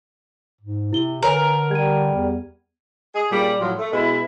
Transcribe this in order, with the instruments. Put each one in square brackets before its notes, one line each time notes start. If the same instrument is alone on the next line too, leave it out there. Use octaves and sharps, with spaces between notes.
[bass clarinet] G#2
[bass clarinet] C3 [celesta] E4 G7
[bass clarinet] D3 [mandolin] A#4 [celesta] B4 C#5 G#5
[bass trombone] G3 [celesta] G#6 D#7
[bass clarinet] E2
[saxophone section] G#4
A#2 C#3 G3
A2 F3 F#3
A3
B2 G#3 E4